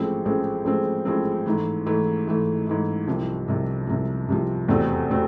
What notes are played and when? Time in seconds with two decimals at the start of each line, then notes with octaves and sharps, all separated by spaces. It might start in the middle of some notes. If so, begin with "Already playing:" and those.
Already playing: A1 A2 F3 G#3 C4
0.25 A1 A2 F3 G#3 C4
0.65 A1 A2 F3 G#3 C4
1.05 A1 A2 F3 G#3 C4
1.46 G#2 E3 A3
1.86 G#2 E3 A3
2.27 G#2 E3 A3
2.66 G#2 E3 A3
3.07 C2 C3 F3
3.48 C2 C3 F3
3.87 C2 C3 F3
4.28 C2 C3 F3
4.68 F1 E2 B2 A3 C4
5.10 B2 A3 C4